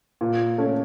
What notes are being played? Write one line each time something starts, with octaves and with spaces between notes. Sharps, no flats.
A#2
A3 C#4